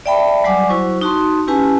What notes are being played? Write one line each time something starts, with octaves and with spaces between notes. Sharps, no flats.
D5 E5 G5 A5 B5
F#3 G3 D5 F#5 G#5 D6
F#3 E4 F#4 C5 C#6
D#4 F#4 A5 C6
C#4 E4 G4 B4 G#5 A5